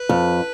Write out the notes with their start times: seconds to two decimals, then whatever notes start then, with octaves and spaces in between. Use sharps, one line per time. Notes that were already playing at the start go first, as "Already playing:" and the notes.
Already playing: B4
0.09 F2